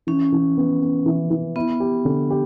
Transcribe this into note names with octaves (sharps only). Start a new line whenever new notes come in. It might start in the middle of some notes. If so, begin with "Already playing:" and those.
E3 C#4
E3
B3
B3
E3
E3
B3 E4
G4
D3
G4